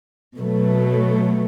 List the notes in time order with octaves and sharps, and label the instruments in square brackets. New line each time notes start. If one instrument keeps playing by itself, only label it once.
[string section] B2 F#3 A3